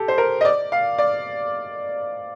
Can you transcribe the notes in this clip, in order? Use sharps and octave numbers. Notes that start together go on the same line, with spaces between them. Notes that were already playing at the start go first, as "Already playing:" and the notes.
Already playing: G4 A4
C5
A#4
D#5
D5
F5
D5